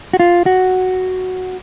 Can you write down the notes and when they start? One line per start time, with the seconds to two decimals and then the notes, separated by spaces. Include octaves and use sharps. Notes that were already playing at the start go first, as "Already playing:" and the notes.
0.13 F#4
0.20 F4
0.46 F#4